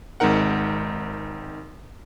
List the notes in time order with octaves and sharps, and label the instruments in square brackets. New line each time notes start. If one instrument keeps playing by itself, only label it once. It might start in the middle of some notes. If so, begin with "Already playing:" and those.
[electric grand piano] G#1 G#3 C4 D#4 A#4 F#5